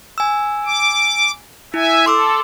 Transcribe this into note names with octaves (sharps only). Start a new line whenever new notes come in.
G#5 E6
D6
E4 E5 G#5
A4 C6 D6 E6